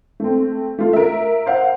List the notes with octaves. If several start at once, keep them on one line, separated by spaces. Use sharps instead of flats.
A3 C4
A3 F4
A#4 E5
C5 F5 F#5